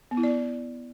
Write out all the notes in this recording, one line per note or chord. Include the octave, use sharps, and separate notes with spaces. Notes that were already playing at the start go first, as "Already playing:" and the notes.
B3
E4
D5